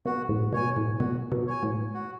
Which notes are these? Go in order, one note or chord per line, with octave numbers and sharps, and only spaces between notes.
B2 F#4
A2
B2 C#5 G#5
A2
B2 F#4
B2
C#5 G#5
A2
F#4